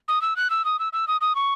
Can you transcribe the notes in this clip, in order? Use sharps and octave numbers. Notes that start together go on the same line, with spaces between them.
D#6
E6
F#6
E6
D#6
E6
E6
D#6
D#6
C#6